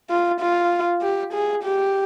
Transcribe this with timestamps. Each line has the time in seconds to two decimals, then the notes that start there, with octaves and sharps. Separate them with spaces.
0.10 F4
0.40 F4
1.02 G4
1.33 G#4
1.63 G4